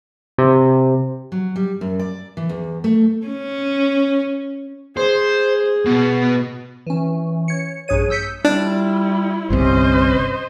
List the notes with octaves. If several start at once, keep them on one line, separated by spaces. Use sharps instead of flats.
C3
F#3
G3
F#2
D5
E3
E2
A3
C#4
G#4 C5
B2
E3 C#4
C#5 C#7
A#1 G2 G#4 C#5 D#7
E6 G6 B6 C#7
G3 D4 E4 F4
G1 C2 C3 C#4 C5 D#5